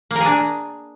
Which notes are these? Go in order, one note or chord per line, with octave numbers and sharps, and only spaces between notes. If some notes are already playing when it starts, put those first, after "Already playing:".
A#3
A#4
G#4
D4